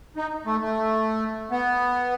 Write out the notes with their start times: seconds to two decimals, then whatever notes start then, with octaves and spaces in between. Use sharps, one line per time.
0.16 D#4
0.46 A3
0.61 A3
1.51 B3